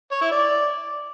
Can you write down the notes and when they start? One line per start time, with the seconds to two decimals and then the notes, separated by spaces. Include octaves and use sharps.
0.12 C#5
0.21 E4
0.31 D5